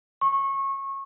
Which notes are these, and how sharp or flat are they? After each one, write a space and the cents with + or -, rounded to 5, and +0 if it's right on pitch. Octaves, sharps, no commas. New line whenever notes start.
C#6 -25